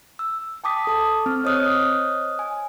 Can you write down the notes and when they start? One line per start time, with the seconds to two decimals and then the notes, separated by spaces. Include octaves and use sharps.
0.19 E6
0.64 G5 A5 D6 D#6 B6
0.87 A4 A5
1.26 C4 F6
1.44 C5 C#5 D#5 D#6 F6 F#6
2.39 G#5